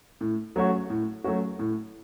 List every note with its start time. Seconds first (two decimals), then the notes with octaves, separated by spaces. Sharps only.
0.21 A2
0.56 F#3 A3 C#4 F#4
0.90 A2
1.24 F#3 A3 C#4 F#4
1.59 A2